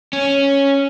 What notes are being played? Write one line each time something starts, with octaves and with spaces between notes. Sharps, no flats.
C#4